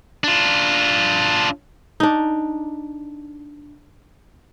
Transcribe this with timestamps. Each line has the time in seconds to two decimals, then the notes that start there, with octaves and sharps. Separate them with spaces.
0.24 D4 F4
2.00 D4 D#4